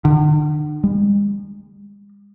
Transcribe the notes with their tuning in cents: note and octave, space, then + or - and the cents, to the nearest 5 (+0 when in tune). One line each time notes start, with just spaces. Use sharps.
D3 +45
G#3 -45